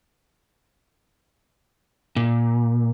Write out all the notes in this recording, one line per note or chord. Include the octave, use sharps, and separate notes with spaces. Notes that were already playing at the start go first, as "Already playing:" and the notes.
A#2